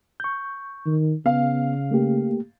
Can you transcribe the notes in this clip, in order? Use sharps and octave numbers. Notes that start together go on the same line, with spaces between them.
C#6 G6
D#3
C#3 B3 F5
A3 A#3 G4